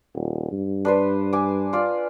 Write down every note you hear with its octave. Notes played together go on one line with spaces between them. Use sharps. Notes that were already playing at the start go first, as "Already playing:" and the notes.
D#1
G2
D4 B4 C5
G#5 D6
F4 D5